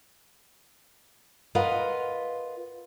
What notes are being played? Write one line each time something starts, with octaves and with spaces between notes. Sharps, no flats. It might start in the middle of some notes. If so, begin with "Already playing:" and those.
F4 A#4 B4 D#5 F5 F#5